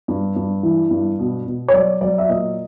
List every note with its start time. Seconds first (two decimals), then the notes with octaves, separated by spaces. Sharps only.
0.08 G2
0.36 G2
0.63 E3
0.91 G2
1.19 B2
1.46 B2
1.68 C#5
1.73 F#3 D5
2.01 F#3 D5
2.18 E5
2.29 A#2 D#5